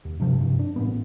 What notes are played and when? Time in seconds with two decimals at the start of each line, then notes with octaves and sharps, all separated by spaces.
0.05 D#2
0.20 G2 C3 F3
0.41 G2 C3
0.59 D4
0.76 A1 A2 B3